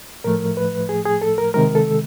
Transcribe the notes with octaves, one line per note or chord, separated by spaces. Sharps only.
A2 F3 A3 A#4
B4
G#4
G#4
A4
A#4
C3 D#3 G#3 A#4
A4